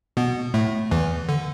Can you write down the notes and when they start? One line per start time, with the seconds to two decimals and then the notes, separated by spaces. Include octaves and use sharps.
0.17 B2 B3
0.54 A2 A3
0.91 E2 E3
1.29 D3